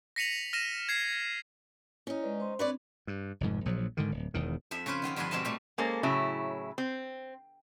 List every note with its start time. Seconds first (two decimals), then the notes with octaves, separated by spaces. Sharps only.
0.16 A#6 B6 C#7 D#7 F7 F#7
0.53 F6 A#6 D#7 E7
0.89 G#6 C7
2.07 C#4 D#4 E4 C#5
2.22 G#3 B4 D5
2.40 C5 C6
2.59 C4 D4 B4 C#5 D5
3.07 G2
3.41 F1 F2 G#2
3.66 A#1 F3 F#3
3.97 G#2 D3 D#3
4.11 D1
4.34 E1 E2 D#3
4.71 F2 F3 E5
4.86 C#3 C#4 B4 C5
5.02 D#3 B3 C4 F4
5.16 G2 D3 F3 B4 G#5 C6
5.31 B2 G#3 C4 A#4 E5 A5
5.45 A#2 G3 A3
5.78 G#3 A#3 C#4 A4 C5
6.03 A2 C#3 F#3 E4
6.78 C4